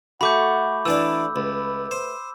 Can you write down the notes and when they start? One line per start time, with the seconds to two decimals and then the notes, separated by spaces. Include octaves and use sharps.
0.21 A3 F#4 F#5 B5 D6 G6
0.86 E3 D4 E4 D5 E6
1.36 C#2 B4
1.91 C5